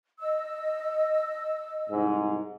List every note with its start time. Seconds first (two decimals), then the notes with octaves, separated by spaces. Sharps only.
0.20 D#5 E6
1.90 C2 G#2